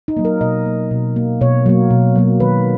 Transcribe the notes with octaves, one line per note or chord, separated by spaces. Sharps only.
D#4
F#3 A#3
A#4
B2 D#5
A#3
B2
A#3
B2 C#5
F#3 A#3
B2
F#3 A#3
D#3 B4